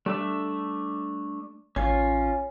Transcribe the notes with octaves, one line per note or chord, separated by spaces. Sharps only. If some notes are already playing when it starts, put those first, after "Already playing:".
G3 A3 D4 E5
A1 C#4 F4 C#5 G#5